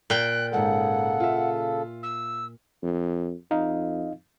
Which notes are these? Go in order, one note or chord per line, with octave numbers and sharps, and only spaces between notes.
A#2 G5 F#6
G#2 C#3 G#3 A4 F#5
F4 E5
E6
F2
F2 D#4 D#5 F5